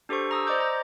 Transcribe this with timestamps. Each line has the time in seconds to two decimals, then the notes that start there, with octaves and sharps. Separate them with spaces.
0.09 D4 G4 A4 C5 C#6
0.31 A#5 D#6 E6
0.47 C5 D5 D#5 A#5 D6 G6
0.60 A#5